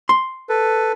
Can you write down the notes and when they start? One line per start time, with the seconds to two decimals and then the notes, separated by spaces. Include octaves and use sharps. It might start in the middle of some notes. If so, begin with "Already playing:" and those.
0.09 C6
0.49 A4 B4